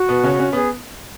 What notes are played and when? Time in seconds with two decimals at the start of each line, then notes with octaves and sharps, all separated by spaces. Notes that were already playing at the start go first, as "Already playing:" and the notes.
Already playing: F#4
0.09 B2 B3
0.23 C#3 C#4
0.39 C#4
0.53 B3 G#4